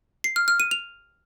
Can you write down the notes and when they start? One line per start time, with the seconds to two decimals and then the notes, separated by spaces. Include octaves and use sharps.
0.24 C7
0.36 F6
0.48 F6
0.60 D#7
0.71 F7